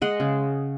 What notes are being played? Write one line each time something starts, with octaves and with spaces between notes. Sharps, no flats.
G#3 D#5 F#5
C#3